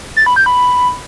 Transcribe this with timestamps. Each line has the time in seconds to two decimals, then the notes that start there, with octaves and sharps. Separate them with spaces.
0.16 A6
0.26 B5
0.36 G6
0.46 B5